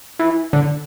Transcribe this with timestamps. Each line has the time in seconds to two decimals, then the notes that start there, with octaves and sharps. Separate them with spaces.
0.19 E3
0.53 D3